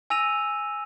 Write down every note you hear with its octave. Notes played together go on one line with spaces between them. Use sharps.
G#5 E6 A#6 D#7 F7